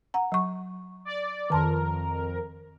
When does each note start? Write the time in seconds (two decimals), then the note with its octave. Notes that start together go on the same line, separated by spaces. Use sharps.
0.14 F#5 A#5
0.32 F#3 C#6
1.05 D5
1.50 F2 D#3 A#4 A5 C6